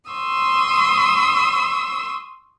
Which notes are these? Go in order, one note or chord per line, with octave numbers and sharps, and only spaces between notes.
C6 C#6 D#6 E6